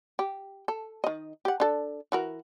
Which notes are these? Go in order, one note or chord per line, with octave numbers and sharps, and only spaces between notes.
G4
A4
D#3 D#5
G4 F#5
D4 A4
E3 F#4 A#4